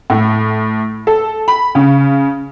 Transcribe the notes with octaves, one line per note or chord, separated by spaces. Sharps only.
A2
A4
B5
C#3